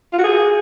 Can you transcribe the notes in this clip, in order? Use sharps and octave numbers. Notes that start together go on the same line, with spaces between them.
F4
F#4
G#4